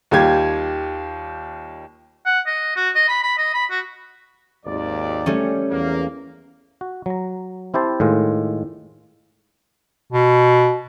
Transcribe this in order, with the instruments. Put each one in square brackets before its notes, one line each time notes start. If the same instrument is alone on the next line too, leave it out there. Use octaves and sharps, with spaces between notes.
[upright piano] D#2 G3 F4 G4 G#6
[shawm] F#5
D#5
F#4
D#5
B5
B5
D#5
B5
F#4
[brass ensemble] G#1 D#2 D5
[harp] G3 A3 C#4
[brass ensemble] E2 A#3
[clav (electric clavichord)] F#4
F#3 A#5
C4 E4 G4 C5 A5
A2 D#3 G#3 F4
[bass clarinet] B2